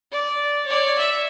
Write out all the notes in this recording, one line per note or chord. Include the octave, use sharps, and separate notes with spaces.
D5
C#5 D5
E5